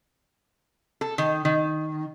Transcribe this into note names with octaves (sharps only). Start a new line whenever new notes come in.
A4
D#3
D#3